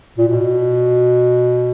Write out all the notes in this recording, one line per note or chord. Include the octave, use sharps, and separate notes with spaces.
A#2
B2